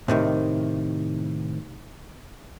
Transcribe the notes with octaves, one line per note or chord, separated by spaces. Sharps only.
A2 C3 D#3